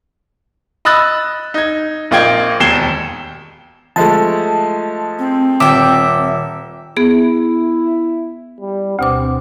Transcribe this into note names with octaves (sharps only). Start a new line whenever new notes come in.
D#5 B5 D#6 E6 F#6 A6
D#4 G#6
A#1 A#3 F4 D#5 G5 G#6
E1 D#2 G#6 C7 E7 G7
F3 G#3 A3 A5
C4
D#1 E5 G5 D6
B3 E4 G#4
G3
D2 B2 C4 D6